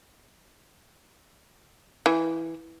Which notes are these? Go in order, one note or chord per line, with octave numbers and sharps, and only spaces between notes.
E3